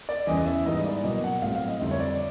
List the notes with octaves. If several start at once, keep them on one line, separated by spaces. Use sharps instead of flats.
D5
E2 C#3 E3 D#5
E5
G#2 E3 G3 B3 D#5
D5
B2 F#3 A#3 D#5
F#5
A2 F#3 A3 C4 F5
F5
D#5
F2 D3 G3 C4 E5
C#5
D5